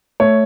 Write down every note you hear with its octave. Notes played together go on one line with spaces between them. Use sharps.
A3 C#5